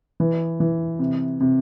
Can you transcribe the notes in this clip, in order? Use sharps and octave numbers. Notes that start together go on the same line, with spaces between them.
E3
E3
C3
C3